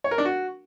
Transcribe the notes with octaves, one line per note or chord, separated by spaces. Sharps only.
C#5
A#4
D4
F#4